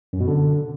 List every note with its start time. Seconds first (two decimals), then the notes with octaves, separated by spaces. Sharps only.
0.13 F#2
0.20 B2
0.27 D3